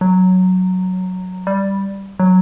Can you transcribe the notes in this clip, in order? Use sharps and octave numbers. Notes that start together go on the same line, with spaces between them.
F#3
G3
F#3